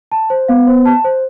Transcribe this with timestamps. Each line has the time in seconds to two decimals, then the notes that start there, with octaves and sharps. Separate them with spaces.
0.12 A5
0.30 C5
0.48 B3 F5
0.67 C5
0.85 A5
1.04 C5